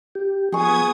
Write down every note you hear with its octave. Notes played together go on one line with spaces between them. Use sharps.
G4
F3 B3 G#4 C#6 D#6 G#6